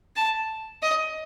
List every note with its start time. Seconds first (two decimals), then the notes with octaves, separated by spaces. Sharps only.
0.16 A5
0.82 D#5